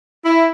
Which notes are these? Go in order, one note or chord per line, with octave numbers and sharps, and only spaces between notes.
E4